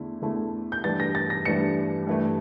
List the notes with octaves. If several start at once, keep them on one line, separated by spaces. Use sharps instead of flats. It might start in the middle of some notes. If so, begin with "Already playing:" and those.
Already playing: E2 D3 A3 E4
E2 D3 A3 E4
G6
G2 E3 A3 D4 A6
A#6
A6
A#6
G2 E3 A3 D4 C#7
G2 E3 A3